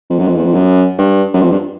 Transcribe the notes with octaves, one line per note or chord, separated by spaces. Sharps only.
F2
F#2
F2
E2
F2
F#2
G2
F#2
F2
G2